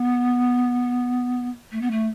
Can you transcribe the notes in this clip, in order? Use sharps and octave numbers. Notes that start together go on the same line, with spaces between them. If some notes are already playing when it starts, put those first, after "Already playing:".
Already playing: B3
A3
B3
A3